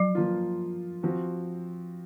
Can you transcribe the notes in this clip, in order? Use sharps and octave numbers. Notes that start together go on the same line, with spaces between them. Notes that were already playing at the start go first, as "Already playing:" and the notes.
Already playing: F3 F#3
F3 A#3 F4
F3 C4 F#4